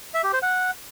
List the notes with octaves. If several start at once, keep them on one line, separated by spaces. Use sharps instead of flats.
E5
G4
C5
F#5